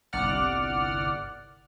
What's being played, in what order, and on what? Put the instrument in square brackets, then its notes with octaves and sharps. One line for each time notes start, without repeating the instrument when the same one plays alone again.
[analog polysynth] G1 C2 D5 F#5 F6